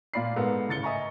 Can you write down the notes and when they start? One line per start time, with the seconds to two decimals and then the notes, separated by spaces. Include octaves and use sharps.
0.14 A#2 A#3 F4 D5 B5 C7
0.36 G#2 B3 A4 A#4
0.69 C#2 A2 A6 C#7 G7
0.83 D#5 E5 G#5 A#5 C#6